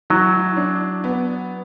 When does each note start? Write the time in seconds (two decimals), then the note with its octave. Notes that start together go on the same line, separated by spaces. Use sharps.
0.10 E3 F#3
0.57 D4
1.04 B3